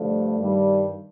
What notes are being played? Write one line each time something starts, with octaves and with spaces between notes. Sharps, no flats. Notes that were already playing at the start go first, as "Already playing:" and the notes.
Already playing: G2 D3 F3 A3
G2 D#3 G3